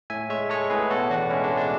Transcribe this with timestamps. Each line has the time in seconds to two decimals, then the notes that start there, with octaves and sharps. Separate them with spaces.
0.10 A2 E5 G#5
0.30 G#3 C#5 E5
0.49 G#3 A4 C#5
0.70 A2 G#4 B4
0.90 B2 F#4 A4
1.10 E2 D4 F#4
1.30 G#3 C#4 E4
1.44 D4
1.51 G#3
1.57 D4